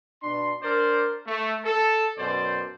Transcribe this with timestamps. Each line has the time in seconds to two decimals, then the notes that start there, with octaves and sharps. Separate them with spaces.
0.22 B2 D4 C6
0.62 D4 A#4 C5 D5
1.27 A3
1.64 A4
2.17 F#2 B2 C5 D5